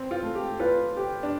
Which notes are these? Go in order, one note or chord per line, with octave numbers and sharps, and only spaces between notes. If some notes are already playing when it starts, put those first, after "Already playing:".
Already playing: C4
F4
A3
G4
F4 B4
G4
D4